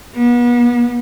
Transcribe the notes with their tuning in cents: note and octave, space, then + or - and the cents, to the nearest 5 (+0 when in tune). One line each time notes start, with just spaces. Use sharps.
B3 -35